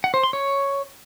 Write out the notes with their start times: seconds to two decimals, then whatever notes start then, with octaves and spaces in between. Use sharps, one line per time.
0.04 F#5
0.14 C5
0.23 C6
0.33 C#5